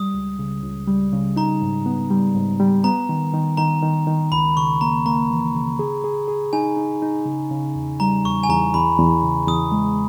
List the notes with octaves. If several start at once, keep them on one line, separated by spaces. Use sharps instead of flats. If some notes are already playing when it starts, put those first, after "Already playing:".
Already playing: G3 D#6
C#2
C#3
C#2
G3
C#3
D#4 A#5
G#2
B3
G3
G#2
G3
B3 A#5
D#3
D#3
D#3 A#5
D#3
D#3
C#2 B5
C#3 C#6
A#3 A#5
A#3 A#5
E3
C#3
G#4
G#4
G#4
D#4 G#5
D#4
D#4
C#3
C#3
E2
G3 A#5
E2 C#6
G#5
E2 A#5
E2 B5
E2
C#3
E2 D#6
G#3